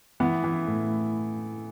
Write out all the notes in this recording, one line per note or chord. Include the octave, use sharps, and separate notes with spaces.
E3 B3
E3
A2